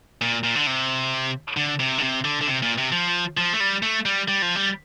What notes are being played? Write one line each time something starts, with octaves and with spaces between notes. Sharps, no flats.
A#2
A#2
D3
C3
D3
C3
D3
C3
D3
D3
C3
A#2
C3
F3
F3
A3
G3
A3
G3
G3
F3
G3